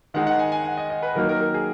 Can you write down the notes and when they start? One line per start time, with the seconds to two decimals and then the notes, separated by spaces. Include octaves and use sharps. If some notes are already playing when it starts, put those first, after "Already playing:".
0.14 D#3 G#3 D#4 F#5
0.27 F#5
0.39 G#5
0.52 G#5
0.65 F#5
0.77 D#5
0.90 D#5
1.03 B4
1.15 D#3 F#3 A#3 D#4 A#4
1.29 A#4
1.41 A#4
1.54 G#4